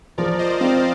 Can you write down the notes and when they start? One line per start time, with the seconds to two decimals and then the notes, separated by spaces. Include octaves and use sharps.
0.18 F3 A#4 D5
0.39 C5 D#5
0.61 C4 D5 F5